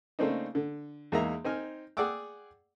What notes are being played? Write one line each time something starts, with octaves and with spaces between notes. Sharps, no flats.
C#3 A3 A#3 C4 D4 D#4
D3
E2 G#3 A#3 D#4 E5 A#5
C4 D#4 G#5 F6
G#4 D5 F#5 G5 D6 E6